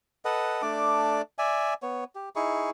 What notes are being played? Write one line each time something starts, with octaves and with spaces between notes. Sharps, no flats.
A4 B4 D#5 F#5
A3 D4 D5 D6
D5 E5 G#5
B3 C#5
G4
D#4 E4 G#4 C#6